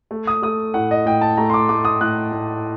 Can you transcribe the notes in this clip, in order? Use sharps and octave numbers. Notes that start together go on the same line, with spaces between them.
A3
D#6
A3 D#6
A2 F#5
D#5
A2 G5
A5
A3 A#5
C6
D6
A3 D6
D#6
A2 F#6
A2